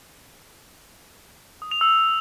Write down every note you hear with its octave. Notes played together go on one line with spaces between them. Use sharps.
D#6
F7
E6